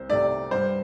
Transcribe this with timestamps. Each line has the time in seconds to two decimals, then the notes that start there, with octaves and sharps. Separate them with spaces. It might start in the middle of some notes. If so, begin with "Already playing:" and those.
Already playing: C2 C5
0.09 C3 A3 D5
0.51 G2 C5